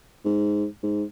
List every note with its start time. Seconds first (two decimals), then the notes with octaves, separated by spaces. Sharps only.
0.25 G#2
0.83 G#2